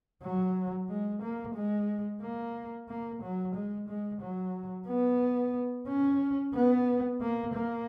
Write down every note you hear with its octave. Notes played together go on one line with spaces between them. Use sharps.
F#3
G#3
A#3
G#3
A#3
A#3
F#3
G#3
G#3
F#3
B3
C#4
B3
A#3
A#3